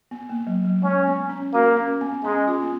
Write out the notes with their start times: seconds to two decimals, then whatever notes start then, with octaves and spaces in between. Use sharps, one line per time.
0.11 B3
0.29 A#3
0.47 F#3
0.65 F#3
0.82 G#3 C#4
1.07 B3
1.29 C#4
1.53 A#3 F#4
1.77 C#4
2.01 B3
2.24 G#3 C#4
2.48 F4
2.62 B3